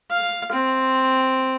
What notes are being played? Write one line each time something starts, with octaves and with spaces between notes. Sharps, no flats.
F5
C4